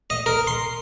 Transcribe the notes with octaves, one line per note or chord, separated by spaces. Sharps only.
D#5
A#4
C6